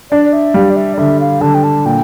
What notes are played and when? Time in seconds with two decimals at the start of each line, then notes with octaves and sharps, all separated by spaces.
0.11 D4 D5
0.25 D5
0.33 E5
0.54 G3 F5
0.70 D5
0.76 E5
0.94 D5
0.98 D3 E5
1.20 F5
1.41 D3 A5
1.54 G5
1.64 A5
1.86 A#2 G5